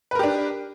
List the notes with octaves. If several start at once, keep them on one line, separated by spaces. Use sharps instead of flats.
D4 G4 A#4 B4